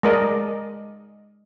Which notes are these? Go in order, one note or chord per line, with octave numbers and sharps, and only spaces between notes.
G#3 A#4 D5 D#5